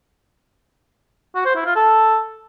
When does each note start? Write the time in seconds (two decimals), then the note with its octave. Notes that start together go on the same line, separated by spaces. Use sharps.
1.35 F#4
1.45 C5
1.56 E4
1.66 F4
1.76 A4